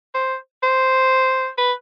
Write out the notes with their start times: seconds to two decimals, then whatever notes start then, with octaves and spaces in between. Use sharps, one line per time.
0.15 C5
0.63 C5
1.58 B4